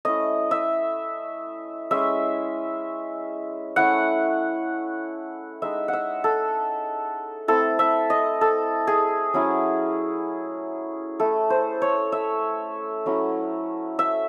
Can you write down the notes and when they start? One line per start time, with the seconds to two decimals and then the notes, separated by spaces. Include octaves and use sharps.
0.05 A3 C#4 E4 D#5
0.51 E5
1.91 G#3 C#4 E4 E5
3.76 A3 C#4 E4 F#5
5.62 G#3 D#4 E5
5.88 F#5
5.93 E5
6.24 A4
7.48 A3 C4 E4 A4
7.79 E5
8.10 D#5
8.41 A4
8.87 G#4
9.34 F#3 C#4 E4
11.20 A3 C#4 E4 A4
11.50 C5
11.82 C#5
12.12 E5
13.06 F#3 A3 C#4 E4
13.99 E5